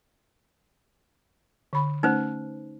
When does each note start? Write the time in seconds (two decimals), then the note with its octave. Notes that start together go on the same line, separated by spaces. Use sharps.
1.73 D3 B5
2.03 A3 C#4 D#4 B4 C5 F#5